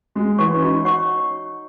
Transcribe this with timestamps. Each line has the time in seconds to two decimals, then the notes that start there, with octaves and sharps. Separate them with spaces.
0.16 G#3 F#4
0.38 E3 C#5 F#5 C#6
0.55 C#4
0.62 D#4 F#4
0.85 C#5 F#5 C#6